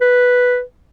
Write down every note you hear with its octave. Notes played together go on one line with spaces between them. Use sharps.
B4